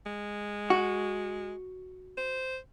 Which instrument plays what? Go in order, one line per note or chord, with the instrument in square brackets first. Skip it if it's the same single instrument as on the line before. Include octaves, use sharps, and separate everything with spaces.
[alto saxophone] G#3
[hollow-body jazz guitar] F#4
[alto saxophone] C5